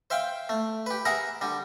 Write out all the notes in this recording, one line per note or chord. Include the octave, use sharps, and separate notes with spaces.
C5 E5 F5 G5
A3
G4 B4
G#4 A#4 E5 F#5 A#5
D3 G3